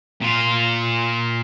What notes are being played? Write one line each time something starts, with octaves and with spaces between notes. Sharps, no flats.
A#2 F4